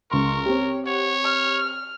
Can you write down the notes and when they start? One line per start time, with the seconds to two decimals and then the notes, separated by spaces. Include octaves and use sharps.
0.11 C#2 A#4 C6 C#6
0.46 C4 G4 C#5
0.87 C#5 F#5
1.24 F6